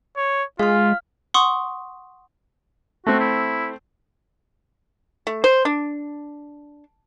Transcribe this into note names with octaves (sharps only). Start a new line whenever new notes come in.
C#5
G#3 F4 F5 F6
F#5 C6 C#6 D#6
A3 C4 F#4
E4
A3
C5
D4